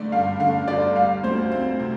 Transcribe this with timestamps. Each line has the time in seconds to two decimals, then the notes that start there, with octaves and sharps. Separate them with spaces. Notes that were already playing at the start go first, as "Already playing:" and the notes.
Already playing: G1 D3 A3 D5
0.12 G2 F5
0.40 D3 F5
0.68 G1 D5
0.96 G3 F5
1.24 D2 C5
1.52 C4
1.79 C3